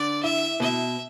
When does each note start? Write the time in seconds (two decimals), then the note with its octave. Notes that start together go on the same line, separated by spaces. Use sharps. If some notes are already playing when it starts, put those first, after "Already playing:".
Already playing: D3 D5
0.23 E4 E5
0.60 B2 E5